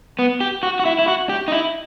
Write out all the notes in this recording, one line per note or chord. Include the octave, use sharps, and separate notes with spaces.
B3
G4
F#4
F#4
E4
E4
F#4
G4
D#4
E4